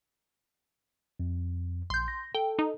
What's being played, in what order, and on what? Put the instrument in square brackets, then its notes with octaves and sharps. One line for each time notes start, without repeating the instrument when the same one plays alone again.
[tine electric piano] F2
[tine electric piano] A#1 [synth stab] C6 G6
[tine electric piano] A#6
[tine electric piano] A4 [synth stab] G5
[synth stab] D#4